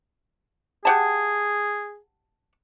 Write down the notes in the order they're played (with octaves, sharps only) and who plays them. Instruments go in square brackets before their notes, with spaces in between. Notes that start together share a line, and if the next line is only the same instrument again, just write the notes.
[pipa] G4 F#5 A5 [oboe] G#4